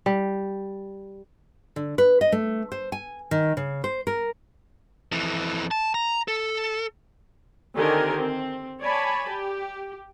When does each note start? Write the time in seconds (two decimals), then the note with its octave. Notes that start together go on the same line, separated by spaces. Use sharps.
0.06 G3
1.76 D3
1.98 B4
2.21 D#5
2.32 A3
2.72 C5
2.92 G#5
3.31 D#3
3.57 C#3
3.84 C5
4.07 A#4
5.12 F2 E3
5.71 A5
5.94 A#5
6.28 A4
7.75 D3 D#3 C4 G4 A#4 G#5
8.17 C4
8.81 C#5 D5 G#5 A5 B5
9.29 G4